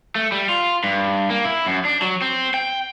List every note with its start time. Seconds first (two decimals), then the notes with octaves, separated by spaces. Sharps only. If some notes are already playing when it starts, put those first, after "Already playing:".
0.16 A3
0.32 G3
0.49 F4
0.84 G2
1.30 A#3
1.45 E4
1.66 F#2
1.85 D4
2.02 F#3
2.22 C4
2.54 G5